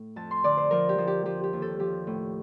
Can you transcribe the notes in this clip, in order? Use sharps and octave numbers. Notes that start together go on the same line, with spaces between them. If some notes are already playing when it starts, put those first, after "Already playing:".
Already playing: A2
F2 A5
C6
D3 D5
C5
F3 A#4
G4
F3
G4
F3 G4
G4
D#2
A4
F3 G4
A2